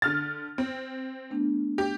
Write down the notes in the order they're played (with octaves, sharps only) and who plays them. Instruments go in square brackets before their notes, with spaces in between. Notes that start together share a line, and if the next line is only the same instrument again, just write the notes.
[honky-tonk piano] D3 F6 A6
C4
[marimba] A3 B3 D4
[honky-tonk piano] G4